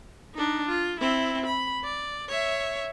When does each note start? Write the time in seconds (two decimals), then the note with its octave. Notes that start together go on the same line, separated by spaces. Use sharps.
0.34 D4 D#4
0.68 F4
1.00 C4 E4
1.46 B5
1.84 D5
2.28 C#5 E5